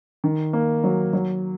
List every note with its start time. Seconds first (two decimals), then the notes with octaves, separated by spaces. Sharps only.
0.24 D#3
0.53 A#3
0.84 F#3
1.13 F#3